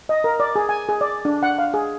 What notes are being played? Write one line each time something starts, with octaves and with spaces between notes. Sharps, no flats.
D#5
A#4
D5
G#4
G#5
G#4
D5
D4
F#5
F5
G#4